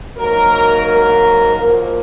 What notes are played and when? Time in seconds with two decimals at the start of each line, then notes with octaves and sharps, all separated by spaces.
0.17 G#2 F#3 A#3 A#4
0.86 A#4
1.56 A#2 F3 A#3 A#4